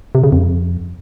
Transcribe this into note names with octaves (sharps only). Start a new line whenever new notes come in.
C3
C#3
F2